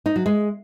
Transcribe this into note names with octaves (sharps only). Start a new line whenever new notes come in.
D#4
F#3
G#3